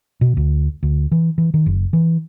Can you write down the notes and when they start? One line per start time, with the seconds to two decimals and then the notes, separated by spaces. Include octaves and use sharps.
0.21 B2
0.37 D2
0.83 D2
1.12 E3
1.38 E3
1.54 D#3
1.66 F#1
1.93 E3